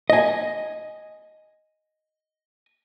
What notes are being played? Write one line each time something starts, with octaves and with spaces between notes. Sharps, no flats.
D#5 G#5